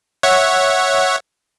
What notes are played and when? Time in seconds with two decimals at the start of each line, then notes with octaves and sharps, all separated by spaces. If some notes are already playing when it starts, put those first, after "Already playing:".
0.23 C#5 E5 F#5